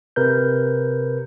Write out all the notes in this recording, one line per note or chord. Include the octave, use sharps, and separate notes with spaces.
C3 A#4 B4 G6